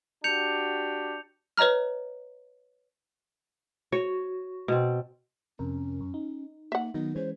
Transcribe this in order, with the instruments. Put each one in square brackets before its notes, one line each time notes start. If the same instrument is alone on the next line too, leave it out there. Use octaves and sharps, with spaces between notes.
[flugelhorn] D4 [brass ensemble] F#4 G4 [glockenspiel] G6 C#7 F7
[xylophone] B4 C#5 D#5 A#5 F6
[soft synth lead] F#4 [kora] C#5
[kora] B2 C4
[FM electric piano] F2 C3 A#4 [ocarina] C#4
[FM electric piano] F#2
D#4
[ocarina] A#3 [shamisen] E5 F#5
[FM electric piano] D#3 F#3 D#4 [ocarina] B3
[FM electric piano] E3 G#3 C#4 [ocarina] C5